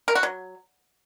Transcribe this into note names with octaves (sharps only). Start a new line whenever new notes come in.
A#4
F#4
F#3